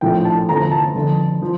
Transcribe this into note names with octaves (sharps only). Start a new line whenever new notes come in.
A#1 A2 F3 A3 G5
A5
F1 E2 D3 F3 A3 A#5
A5
G1 F2 D3
F3